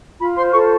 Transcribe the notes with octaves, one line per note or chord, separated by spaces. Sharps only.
F4 B5
C5 C6
A4 C#6